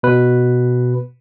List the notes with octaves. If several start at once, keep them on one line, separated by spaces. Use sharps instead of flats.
B2 B4